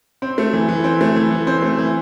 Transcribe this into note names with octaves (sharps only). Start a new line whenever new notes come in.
C4
A3
E3
E3
C4
A3
E3
E3
C4
A3
E3